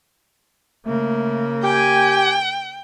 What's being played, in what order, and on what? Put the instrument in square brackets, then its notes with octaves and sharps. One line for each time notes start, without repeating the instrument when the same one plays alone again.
[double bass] C#3 A#3 [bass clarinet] A3
[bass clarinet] G4 [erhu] G5 [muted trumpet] G#5